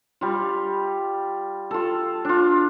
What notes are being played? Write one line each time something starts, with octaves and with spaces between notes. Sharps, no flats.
G3 F4
F4 A4
D4 F4